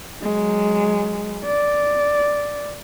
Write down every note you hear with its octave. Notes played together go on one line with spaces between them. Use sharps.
F#3 G#3
D5